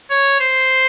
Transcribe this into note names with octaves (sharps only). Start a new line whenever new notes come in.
C#5
C5